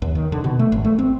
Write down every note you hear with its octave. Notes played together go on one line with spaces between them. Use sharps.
D#2
D#3
D3
B2
A3
G#1
A3
C4